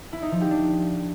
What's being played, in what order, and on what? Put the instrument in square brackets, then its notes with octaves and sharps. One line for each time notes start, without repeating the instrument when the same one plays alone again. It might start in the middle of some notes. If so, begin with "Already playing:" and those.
[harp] E4
D#4
F3
G4
D4